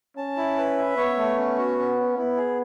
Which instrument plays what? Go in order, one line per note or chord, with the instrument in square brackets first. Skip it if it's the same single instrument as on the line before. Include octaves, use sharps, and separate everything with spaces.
[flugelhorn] C#4 [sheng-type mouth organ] A5
[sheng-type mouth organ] E4
B4
E5
[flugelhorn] B3 [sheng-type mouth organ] C#5
[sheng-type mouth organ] A3
C#4
F#4
C#4
C#4
[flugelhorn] B3 [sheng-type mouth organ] E4
[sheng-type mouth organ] G#4